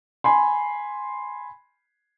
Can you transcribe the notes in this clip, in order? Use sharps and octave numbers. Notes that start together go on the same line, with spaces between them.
G#5 B5 C6